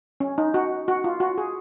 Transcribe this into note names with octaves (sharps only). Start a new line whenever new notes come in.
C#4
D#4
F#4
F#4
F4
F#4
G#4